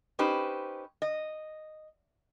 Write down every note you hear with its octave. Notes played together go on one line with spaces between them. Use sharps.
C#4 D#4 G4 B4 C5
D#5